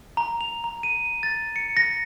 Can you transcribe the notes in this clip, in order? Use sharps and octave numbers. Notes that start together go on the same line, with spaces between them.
A#5
F7
A#5
D#7
A6
C#7
A#6